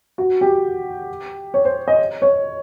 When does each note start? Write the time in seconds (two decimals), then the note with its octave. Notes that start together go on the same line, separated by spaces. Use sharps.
0.18 F#4
0.41 G4
1.54 C#5
1.65 C5
1.88 D#5
2.22 C#5